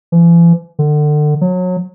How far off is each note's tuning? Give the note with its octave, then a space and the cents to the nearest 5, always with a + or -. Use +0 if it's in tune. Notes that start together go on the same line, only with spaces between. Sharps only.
E3 +45
D3 +30
F#3 -25